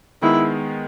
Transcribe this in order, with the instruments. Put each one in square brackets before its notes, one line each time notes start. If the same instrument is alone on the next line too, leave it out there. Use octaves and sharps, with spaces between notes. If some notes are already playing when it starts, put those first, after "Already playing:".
[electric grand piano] D#3 G#3 B3 [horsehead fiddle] E4